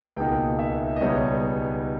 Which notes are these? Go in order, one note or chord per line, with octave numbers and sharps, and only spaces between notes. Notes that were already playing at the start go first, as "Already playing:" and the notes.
C#2 B2 A#3 D#4 G5
E5
D#5
C#2 B2 G3 B3 D#4 C#5